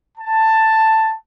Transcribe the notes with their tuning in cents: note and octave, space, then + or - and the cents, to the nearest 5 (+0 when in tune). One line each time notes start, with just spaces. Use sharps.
A5 +10